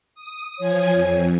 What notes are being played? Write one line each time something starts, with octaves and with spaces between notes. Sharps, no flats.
D#6
F3 C#5 G#5
F2